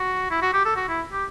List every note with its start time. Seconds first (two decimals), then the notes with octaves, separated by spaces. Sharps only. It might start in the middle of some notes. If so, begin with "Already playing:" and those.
Already playing: F#4
0.31 E4
0.42 F#4
0.54 G4
0.65 A4
0.76 F#4
0.89 E4
1.12 G4